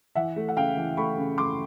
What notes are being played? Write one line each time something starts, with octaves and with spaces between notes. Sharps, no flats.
E3 E5 F#5
A3
F#5
C#3 F5 G5
E3
A3 B5 C#6
C#3
A3 C6 D6